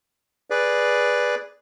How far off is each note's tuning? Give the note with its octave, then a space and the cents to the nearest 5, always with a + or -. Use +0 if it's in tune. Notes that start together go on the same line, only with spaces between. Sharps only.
G#4 +0 B4 +0 D5 +0